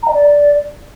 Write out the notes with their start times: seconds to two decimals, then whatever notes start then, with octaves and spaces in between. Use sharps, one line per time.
0.03 A#5
0.08 D#5
0.13 D5